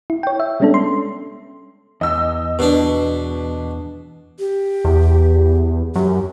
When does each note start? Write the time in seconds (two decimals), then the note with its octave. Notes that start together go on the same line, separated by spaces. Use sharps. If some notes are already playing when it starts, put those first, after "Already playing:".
0.10 E4
0.23 C#5 G5
0.40 E5
0.60 G3 G#3 B3 C#4 D4 A4
0.74 C6
2.01 E2 D#5 E6
2.59 B2 B3 D4
4.39 G4
4.85 E2
5.95 F#2 G4